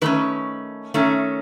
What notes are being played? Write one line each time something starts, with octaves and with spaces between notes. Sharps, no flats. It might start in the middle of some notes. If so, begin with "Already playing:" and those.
D#3 A3 C#4 B4
D#3 A3 C#4